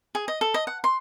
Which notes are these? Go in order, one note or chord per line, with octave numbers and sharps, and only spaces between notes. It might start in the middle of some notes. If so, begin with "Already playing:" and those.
G#4
D#5
A4
D#5
F#5
C6